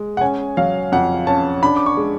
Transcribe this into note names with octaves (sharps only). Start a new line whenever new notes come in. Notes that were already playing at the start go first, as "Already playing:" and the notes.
Already playing: G#3
F#5
C#4 G#5
F#3 F5
F2 F#5
C#4 A5
D4 B5
D6
C#6
G#3